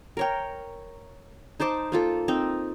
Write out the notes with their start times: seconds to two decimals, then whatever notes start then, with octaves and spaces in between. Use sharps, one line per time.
0.17 A#4 C#5 G5
1.60 D#4 C5 A5 D6
1.92 A#3 F4 A4
2.28 C4 D#4